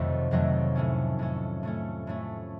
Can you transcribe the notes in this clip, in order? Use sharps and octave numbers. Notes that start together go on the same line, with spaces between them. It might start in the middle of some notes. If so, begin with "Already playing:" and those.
Already playing: F2 C3 D#3 F#3 A3
F2 C3 D#3 F#3 A3
A2 A3 C#4
A2 A3 C#4
A2 A3 C#4
A2 A3 C#4